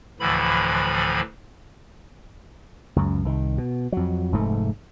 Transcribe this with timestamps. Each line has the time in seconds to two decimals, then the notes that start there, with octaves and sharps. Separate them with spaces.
0.20 D2 A2 D3 E3 F3 B5
2.96 C#2 F#2
3.25 C2 D#3
3.58 B2
3.92 F2 F#3
4.32 F1 G#2 A3